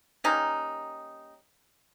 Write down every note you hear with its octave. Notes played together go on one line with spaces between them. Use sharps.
G3 A#3 C#4 D#4